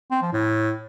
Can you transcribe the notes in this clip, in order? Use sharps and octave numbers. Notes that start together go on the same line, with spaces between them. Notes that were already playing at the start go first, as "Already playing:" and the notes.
C4
F3
A2